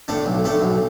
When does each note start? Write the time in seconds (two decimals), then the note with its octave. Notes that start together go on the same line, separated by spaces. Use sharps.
0.08 A2 A3 D4
0.26 B1
0.44 A2 A3 D4
0.62 B1